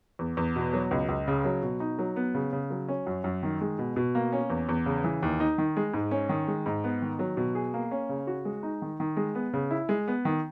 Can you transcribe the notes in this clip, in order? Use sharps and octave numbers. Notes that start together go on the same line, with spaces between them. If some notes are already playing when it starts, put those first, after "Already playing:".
E2
E2
B2
F#3
C#2
C#2
C#3
F#3
B2
D#4
F#3
B3
C#3
C#3
F#3
C#4
F#2
F#2
D#3
G#3
B2
B2
A#3
C#4
E2
E2
C#3
E3
D#2
D#4
D#3
G#3
G#2
C#4
D#3
G#3
G#2
B3
D#3
F#3
B2
G#4
A#3
C#4
C#3
F#4
G#3
D#4
D#3
D#3
G#3
B3
C#3
E4
G#3
B3
D#3